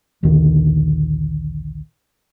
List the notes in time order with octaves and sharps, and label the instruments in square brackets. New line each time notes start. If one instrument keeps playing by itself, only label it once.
[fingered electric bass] A#1 D#2 D3 D#3